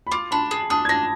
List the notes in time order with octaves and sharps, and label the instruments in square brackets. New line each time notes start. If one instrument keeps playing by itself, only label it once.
[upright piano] B5
[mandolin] F4 [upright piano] D6
[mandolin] D4 [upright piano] B5
[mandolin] G#4
[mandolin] D4 [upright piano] D#6
[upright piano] G#6
[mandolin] D4 [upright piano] A#6